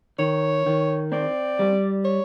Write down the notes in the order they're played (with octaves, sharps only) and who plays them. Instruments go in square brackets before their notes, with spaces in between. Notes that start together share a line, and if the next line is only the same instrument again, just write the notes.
[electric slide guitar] D#3 [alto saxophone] C#5
[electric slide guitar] D#3
[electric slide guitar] C4 [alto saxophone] D5
[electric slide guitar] G3
[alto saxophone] C#5